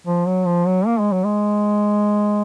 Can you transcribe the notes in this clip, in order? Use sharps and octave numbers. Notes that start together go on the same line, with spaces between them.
F3
F#3
F3
F#3
A#3
G#3
F#3
G#3